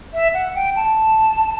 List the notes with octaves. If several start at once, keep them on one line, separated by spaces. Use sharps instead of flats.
E5
F#5
G5
A5